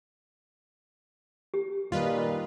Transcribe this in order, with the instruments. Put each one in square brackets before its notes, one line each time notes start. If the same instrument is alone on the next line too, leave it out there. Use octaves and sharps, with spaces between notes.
[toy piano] G4
[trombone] A#2 [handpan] D#3 G3 D#5 [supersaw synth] F4 B4